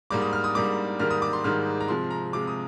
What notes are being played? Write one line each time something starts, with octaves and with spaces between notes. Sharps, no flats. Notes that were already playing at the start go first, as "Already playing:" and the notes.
G#2 G3 A#3 D6
D#6
F6
D#6
G#2 G3 A#3 D6
G#2 D#3 G3 A#3 F6
D#6
D6
C6
G#2 D#3 G3 A#3 F6
A#5
C3 F3 G#3 C6
A#5
C3 F3 G#3 D6
D#6